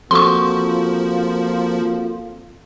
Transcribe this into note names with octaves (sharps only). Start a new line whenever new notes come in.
F3 A#3 C4 F4 F#4 A4 C6 C#6